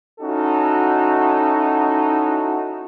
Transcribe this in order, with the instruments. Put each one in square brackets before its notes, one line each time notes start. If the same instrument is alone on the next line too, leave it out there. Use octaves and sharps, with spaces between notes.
[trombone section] C#4 D#4 E4 F#4 A4